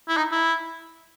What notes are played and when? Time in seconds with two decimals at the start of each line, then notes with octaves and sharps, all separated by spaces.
0.08 E4
0.17 D#4
0.32 E4